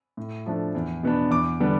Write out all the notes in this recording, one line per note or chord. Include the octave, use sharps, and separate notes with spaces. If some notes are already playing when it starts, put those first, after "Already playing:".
A2
F3 A3 D4
E2
B2 B3 D4
E2 D6
D3 G3 B3 D4